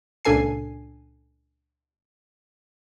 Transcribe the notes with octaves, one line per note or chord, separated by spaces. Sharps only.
C#2 A#2 D4 A4 G#5 C7